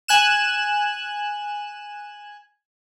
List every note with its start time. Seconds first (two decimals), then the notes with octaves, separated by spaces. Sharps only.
0.08 G#5 F#6 E7